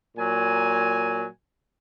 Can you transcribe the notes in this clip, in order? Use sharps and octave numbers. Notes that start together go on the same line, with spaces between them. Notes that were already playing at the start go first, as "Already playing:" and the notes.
A#2 F#3 G#5